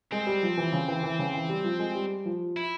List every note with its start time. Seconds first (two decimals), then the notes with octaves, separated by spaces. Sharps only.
0.12 G#3 C4
0.27 G3
0.43 F3
0.57 E3
0.72 C#3
0.88 E3
1.03 E3
1.19 C#3
1.34 E3
1.49 G3
1.64 F3
1.79 G#3
1.95 G3
2.25 F3
2.57 E4